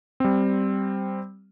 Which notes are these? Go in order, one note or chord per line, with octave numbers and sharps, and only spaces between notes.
G3 C4